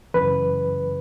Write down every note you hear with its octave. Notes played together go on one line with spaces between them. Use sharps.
F#2 C#3 E3 B4